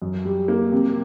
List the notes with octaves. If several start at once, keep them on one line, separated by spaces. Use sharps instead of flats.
F#2
G3
A#3
C3